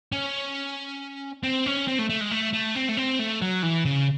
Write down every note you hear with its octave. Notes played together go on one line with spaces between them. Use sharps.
C#4
C4
C#4
C4
A3
A3
G#3
A3
A3
C4
A3
C4
A3
F#3
E3
C#3